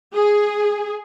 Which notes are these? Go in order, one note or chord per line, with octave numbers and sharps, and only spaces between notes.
G#4